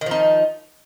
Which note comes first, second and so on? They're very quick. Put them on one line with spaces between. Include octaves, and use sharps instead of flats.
D#3 F3 D#4